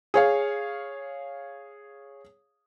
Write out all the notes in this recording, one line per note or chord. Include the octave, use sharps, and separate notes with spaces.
G#4 C#5 F5